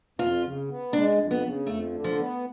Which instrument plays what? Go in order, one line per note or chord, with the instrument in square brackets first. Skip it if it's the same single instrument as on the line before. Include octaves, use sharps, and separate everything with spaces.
[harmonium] F2 [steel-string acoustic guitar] F4
[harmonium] C#3
B3
[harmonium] G#3 [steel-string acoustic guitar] D4
[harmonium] F2
[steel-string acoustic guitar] B3
[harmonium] C#3
[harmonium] F2 [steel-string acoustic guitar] A3
[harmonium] D3
[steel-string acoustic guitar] F3
[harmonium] B3